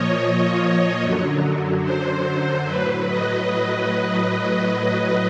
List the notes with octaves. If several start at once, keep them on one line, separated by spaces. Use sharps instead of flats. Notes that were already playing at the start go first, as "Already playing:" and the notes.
Already playing: A#2 F3 C#5 D#5
F#2 D3 F#3
C5
F#3 B4
A2
D#5